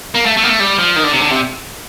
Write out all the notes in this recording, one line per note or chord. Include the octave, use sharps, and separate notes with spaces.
A#3
A3
A3
A#3
A3
G3
F3
D#3
D3
C3
D3
C3